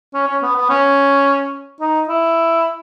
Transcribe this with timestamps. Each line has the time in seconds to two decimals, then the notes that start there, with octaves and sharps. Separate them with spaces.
0.14 C#4
0.27 C#4
0.42 B3
0.56 B3
0.70 C#4
1.80 D#4
2.08 E4